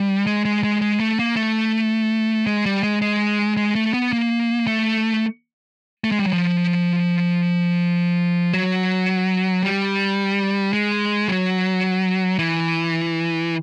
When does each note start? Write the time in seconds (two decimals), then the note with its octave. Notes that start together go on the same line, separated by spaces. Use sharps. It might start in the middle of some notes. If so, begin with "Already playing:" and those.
Already playing: G3
0.27 G#3
0.45 G#3
0.64 G#3
0.81 G#3
1.00 A3
1.19 A#3
1.36 A3
2.47 G#3
2.66 G3
2.83 G#3
3.02 G#3
3.57 G#3
3.75 A3
3.93 B3
4.13 A#3
4.67 A3
6.04 A3
6.12 G#3
6.19 G3
6.26 F#3
6.33 F3
8.54 F#3
9.63 G3
10.73 G#3
11.28 F#3
12.39 E3